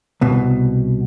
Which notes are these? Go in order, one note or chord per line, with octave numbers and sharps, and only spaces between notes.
C2 B2